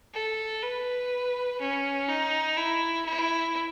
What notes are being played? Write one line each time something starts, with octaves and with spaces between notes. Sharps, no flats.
A4
B4
C#4
D#4
E4
E4